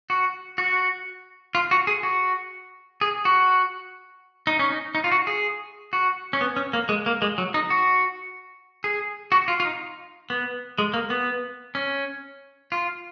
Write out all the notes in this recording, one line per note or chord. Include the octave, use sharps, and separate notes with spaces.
F#4
F#4
F4
F#4
G#4
F#4
G#4
F#4
D#4
C#4
D#4
D#4
F4
F#4
G#4
F#4
C#4
B3
C#4
A#3
G#3
A#3
G#3
F#3
D#4
F#4
G#4
F#4
F4
F4
D#4
B3
G#3
A#3
B3
C#4
F4